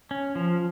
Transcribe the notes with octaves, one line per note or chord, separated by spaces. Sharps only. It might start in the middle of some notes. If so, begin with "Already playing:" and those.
C#4
F3